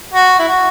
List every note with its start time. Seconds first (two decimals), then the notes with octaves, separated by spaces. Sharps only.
0.14 F#4
0.39 E4
0.48 F#4